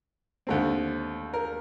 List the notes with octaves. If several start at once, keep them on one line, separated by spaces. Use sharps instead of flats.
D#2 D3 A3 C4
A#4